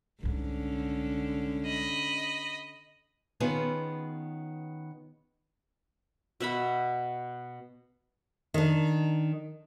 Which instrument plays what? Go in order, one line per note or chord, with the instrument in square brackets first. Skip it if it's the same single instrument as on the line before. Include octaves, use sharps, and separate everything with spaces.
[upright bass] C2 G#2 [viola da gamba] D3 C#4
[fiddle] D#5 B5
[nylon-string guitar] D#3 B3 C#4 F4 G#4 B4
[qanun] B2 E5 F#5 B5
[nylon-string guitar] D#3 D4